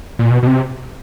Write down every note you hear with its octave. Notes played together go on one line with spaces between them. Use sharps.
A#2
B2
B2
C3